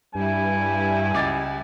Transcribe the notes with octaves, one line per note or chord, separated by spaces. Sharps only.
G2 G3 E4 G#5
C#2 D6 A6